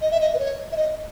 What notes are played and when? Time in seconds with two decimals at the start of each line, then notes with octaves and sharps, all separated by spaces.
0.02 D#5
0.11 E5
0.21 D#5
0.34 B4
0.39 C#5
0.72 E5
0.76 D#5